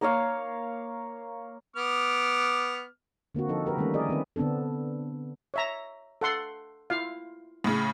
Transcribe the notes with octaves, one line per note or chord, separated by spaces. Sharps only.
A#3 A#4 C#5 F5
B3 D6 F6
D3 A#3 C4 F#4
F3 D#4 A4
G4 A#4 B4
D#3 G3 A3 A#3 C#4
E4 G#4 A#4 D5 D#5
D#3 C4 B4
D3 B3 C4 D4 A4
C#5 E5 A#5
A4 F#5 C6
E4 F4 F5
A2 C#3